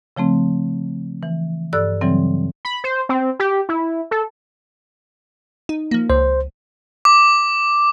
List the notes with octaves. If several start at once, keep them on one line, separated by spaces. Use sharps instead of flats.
C#3 F3 A3 C4
E3
G2 A4 D5 E6 F#6
C#3 E3 F#3 G3 C4
B5
C5
C4
G4
E4
A4
D#4
F3 A#3
C#2 C5
D6